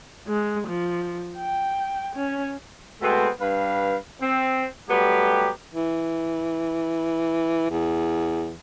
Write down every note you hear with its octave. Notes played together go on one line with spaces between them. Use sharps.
G#3
F3
G5
C#4
B2 G#3 A3 B3 C4
G2 B4 F5
C4
F#3 G3 A3 B3 G4
E3
E2